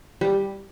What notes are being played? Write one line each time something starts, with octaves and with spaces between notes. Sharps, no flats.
G3